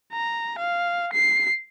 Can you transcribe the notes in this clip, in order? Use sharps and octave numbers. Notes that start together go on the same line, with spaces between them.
A#5
F5
C7